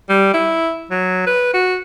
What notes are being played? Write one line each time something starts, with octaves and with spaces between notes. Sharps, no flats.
G3
E4
F#3
B4
F#4